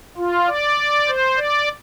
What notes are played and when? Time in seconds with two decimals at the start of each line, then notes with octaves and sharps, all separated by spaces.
0.17 F4
0.47 D5
1.08 C5
1.37 D5